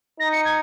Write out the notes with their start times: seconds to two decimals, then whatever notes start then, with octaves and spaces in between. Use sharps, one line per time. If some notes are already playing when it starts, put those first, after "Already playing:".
0.20 D#4 A#6
0.32 C#7
0.45 G#6